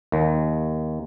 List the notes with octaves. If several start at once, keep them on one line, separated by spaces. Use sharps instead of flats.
D#2